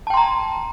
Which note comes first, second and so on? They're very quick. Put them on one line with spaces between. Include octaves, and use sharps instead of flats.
A5 G5 C6 A#5